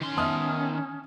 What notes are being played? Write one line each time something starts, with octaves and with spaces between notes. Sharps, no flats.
D#3 C#4 C6
B3 D#5 E5 A5 D#6 F6